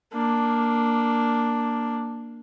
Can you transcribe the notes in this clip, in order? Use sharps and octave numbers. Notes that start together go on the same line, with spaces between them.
A#3 D4